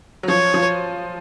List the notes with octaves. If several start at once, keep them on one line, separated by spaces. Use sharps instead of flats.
F#3
F3 C#5
F3